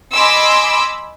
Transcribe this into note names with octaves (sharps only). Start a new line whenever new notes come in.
D#5 G#5 B5 C6 D6 E6